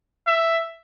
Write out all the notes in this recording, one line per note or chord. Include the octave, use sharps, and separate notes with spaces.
E5